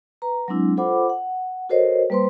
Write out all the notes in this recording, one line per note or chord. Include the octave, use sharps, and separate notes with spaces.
B4 A#5
F#3 G#3 C4 D4 E4
F4 A4 C5 F#5 B5 D6
F#5
F#4 A4 A#4 C5 C#5 D#5
G3 A#3 B4 C5 C6